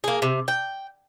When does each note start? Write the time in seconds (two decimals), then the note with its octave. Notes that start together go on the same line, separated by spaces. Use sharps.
0.04 A#3 G#4
0.22 C3
0.48 G5